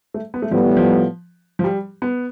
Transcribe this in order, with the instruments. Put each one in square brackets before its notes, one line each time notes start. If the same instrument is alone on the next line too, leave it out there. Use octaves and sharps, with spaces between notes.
[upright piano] A3
B3
A3
[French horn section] A2 G3 B3 [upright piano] F3
[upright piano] E3
F3
F3
G3
B3